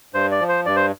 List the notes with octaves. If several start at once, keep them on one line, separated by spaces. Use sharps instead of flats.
G2 C5
D5
F3
C5
G2 D5
C5